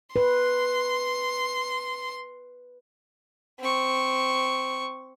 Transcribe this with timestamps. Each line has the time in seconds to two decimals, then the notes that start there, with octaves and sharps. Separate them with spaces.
0.16 B4 C6
3.60 C4 C#6